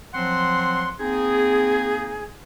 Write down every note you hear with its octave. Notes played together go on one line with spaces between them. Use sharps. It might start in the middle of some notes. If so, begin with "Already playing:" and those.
F3 F#3 C4 F#5 C6
A#3 C4 D#4 G#4